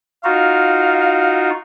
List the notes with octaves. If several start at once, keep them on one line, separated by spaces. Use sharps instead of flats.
D#4 F4 F#4 F5